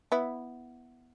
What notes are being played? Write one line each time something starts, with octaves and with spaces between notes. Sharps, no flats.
B3 E4